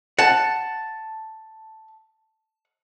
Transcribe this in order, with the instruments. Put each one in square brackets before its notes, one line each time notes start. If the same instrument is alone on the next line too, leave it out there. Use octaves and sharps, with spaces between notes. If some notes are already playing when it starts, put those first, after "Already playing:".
[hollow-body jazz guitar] F#5 [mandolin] A5